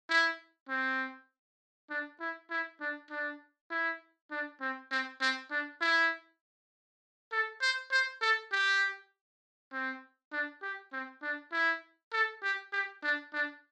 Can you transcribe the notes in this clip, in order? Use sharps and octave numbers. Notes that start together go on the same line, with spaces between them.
E4
C4
D4
E4
E4
D4
D4
E4
D4
C4
C4
C4
D4
E4
A4
C5
C5
A4
G4
C4
D4
G4
C4
D4
E4
A4
G4
G4
D4
D4